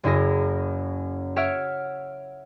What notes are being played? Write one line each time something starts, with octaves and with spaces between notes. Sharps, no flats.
F#1 F#2 E4 G#4 A#6
C#5 E5 F#5 F6 D7